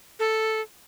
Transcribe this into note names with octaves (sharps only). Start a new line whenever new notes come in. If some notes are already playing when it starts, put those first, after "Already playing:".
A4